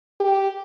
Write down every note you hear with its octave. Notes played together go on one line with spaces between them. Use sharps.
G4